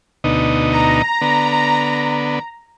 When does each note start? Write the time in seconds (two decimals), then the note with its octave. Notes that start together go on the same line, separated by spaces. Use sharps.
0.24 D2 B2 D#4
0.73 A#5
1.21 D3 B3